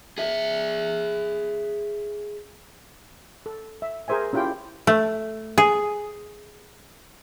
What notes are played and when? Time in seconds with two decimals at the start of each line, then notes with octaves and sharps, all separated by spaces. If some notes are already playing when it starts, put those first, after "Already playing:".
0.18 G#4 E5
3.46 A4
3.82 E5
4.08 G#4 A#4 C5 E5 G#5
4.33 C#4 E4 F4 G4 G5
4.87 A3
5.58 G#4